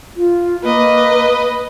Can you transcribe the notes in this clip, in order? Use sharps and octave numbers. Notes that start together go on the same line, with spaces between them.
F4
A#3 B4 D#5